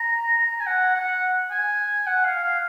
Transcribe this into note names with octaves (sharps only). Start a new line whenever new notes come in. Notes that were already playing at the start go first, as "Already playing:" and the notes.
Already playing: A#5
A#5
G#5
F#5
F#5
G#5
F#5
F5
F5